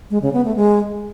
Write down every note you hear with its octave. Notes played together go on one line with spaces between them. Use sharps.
G#3
C#3
B3
A3
G#3